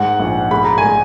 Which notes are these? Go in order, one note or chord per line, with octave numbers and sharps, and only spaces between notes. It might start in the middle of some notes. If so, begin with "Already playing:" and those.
Already playing: G#2 F#5
A#1
G#3 B5
A#5
G#5
G#3